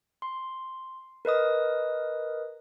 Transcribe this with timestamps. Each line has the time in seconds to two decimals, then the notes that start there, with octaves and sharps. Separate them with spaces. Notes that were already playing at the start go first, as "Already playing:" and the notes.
0.22 C6
1.25 A#4 B4 D#5 D#6